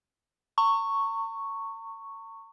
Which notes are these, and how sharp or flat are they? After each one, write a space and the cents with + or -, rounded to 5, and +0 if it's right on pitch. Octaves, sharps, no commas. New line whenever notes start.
A#5 -45 C#6 +0